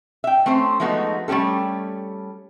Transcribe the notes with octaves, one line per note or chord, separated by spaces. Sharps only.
E5 G5
A3 C4 C#4 C5
F3 G#3 A3 B3 D#4 F#4
G3 A3 C#4 G4 A4